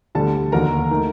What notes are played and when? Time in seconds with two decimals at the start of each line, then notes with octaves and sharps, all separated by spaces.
0.15 D2 D3 G3 A4 A5
0.52 D#2 D3 F#3 A#3 A#4 A#5
0.91 D#3 A3